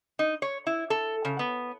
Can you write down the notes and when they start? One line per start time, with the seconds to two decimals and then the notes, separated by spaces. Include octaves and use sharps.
0.19 D#4
0.42 C#5
0.67 E4
0.90 A4
1.25 C#3
1.39 B3